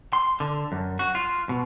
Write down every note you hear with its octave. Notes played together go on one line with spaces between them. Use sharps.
C6
D3
F#2
F#4
F4
B2